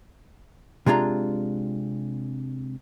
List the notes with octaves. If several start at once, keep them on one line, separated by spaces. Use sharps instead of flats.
C3 G#3 D4 F4 A#5